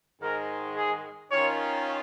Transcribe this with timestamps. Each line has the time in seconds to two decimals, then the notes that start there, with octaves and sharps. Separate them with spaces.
0.22 G#2 D#3 G#3 A#4
0.76 G#4
1.31 D#3 C#4 F4 C#5